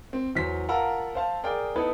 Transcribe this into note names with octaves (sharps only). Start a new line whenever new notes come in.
C4
E2 F#3 C5 B6
F4 A#4 F#5 A5 A#5 E6
C5 F5 A5
G#4 A#4 D5 G5
B3 D#4 E4 A4 B4